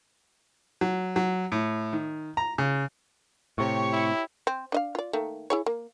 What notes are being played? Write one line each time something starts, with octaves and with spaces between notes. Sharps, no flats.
F#3
F#3
A2
D#3
A#5
C#3
A2 C3 G4 C#5 C#6
E4
C4
D4 D#5 F5
F4 D5
D#3 A3 A#3
E4 G#4 C#5
A#3